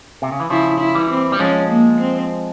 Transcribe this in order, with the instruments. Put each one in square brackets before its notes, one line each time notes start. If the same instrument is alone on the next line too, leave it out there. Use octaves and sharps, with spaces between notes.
[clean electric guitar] C3
C#3
E3
[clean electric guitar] C#3 F3 [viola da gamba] E4
[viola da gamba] E4
[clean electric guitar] E3 G3
[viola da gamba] C4
[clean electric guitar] G3
[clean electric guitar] F3 G#3 [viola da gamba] C#4
[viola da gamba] A#3
C4